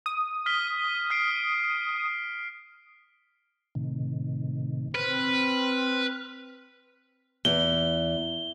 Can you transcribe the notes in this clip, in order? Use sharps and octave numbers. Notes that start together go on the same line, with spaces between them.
D#6
F6 B6 G7
F6 C7 D7
A2 C3 D#3
C4 B4 F6
E2 G7